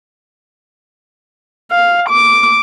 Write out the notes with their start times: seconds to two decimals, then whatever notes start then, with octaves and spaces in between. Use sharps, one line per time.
1.72 F5
2.10 D6